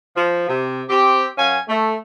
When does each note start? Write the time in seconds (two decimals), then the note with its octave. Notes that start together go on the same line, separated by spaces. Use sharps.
0.16 F3
0.48 C3
0.89 C4 G4
1.38 F#2 C#4 F5 G#5
1.68 A3